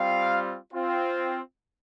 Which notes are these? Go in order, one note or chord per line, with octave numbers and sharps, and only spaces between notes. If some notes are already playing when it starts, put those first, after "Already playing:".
Already playing: G3 C4 F4 F5
C4 F4